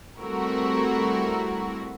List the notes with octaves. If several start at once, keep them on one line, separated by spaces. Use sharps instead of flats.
G3 A3 C4 E4 F#4 A#4